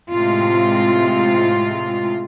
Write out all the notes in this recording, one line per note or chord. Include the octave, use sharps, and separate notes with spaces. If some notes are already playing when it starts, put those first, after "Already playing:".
A2 C3 G#3 F4